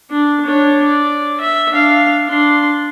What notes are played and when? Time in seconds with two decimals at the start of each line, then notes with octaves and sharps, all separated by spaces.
0.11 D4
0.45 D4 C#5
0.85 D5
1.40 E5
1.71 D4 F5
2.28 D4 C6